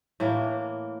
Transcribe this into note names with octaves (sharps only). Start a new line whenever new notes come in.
A2 E3 A#3